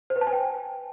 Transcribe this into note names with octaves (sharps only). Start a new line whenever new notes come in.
C5
B4
A5
G#5
G5